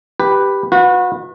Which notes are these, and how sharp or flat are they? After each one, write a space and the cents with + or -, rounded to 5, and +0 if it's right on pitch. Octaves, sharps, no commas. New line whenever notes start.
G4 +0 B4 +0
F#4 -35 B4 +0